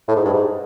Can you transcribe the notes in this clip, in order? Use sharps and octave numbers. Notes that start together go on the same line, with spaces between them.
A2
G#2
G2
G#2